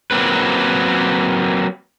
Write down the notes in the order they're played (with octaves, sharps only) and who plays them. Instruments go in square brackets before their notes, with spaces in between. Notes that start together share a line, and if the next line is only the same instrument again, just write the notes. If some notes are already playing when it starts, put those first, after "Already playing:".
[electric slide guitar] F#3 A#3 C4 B4